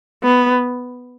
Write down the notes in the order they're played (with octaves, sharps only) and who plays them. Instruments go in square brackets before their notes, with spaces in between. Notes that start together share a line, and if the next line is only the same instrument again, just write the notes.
[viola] B3